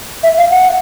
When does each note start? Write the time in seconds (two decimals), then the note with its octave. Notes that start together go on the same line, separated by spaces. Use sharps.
0.23 E5
0.37 F5
0.51 F#5